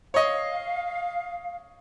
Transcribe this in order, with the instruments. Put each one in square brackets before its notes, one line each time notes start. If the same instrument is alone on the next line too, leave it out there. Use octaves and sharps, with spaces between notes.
[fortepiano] C#5 D#5 [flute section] F5